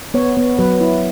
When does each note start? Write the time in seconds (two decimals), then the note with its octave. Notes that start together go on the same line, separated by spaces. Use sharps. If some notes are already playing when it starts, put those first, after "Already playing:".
0.14 B3 C#5
0.37 B3
0.59 F#3 B4
0.81 E4